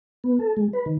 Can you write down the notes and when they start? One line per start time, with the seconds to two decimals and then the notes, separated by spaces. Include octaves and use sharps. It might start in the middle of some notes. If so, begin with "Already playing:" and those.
0.24 B3
0.39 A4
0.57 G#3
0.73 B4
0.86 D#3